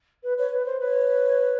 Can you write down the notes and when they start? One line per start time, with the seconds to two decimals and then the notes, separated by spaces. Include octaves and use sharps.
0.24 B4
0.37 B4 C#5
0.52 B4
0.66 C5
0.80 B4 C#5